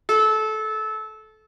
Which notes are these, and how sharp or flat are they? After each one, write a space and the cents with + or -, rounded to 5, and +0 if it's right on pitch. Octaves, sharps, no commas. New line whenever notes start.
A4 -20